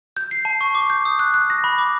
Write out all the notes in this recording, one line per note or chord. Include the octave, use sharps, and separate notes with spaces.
G6
C7
A5
C#6
D6
G6
D#6
F#6
F#6
A#6
B5
D6